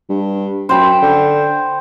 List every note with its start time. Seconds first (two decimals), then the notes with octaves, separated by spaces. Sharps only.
0.09 G2
0.69 F#2 C5 G5 B5
1.02 D3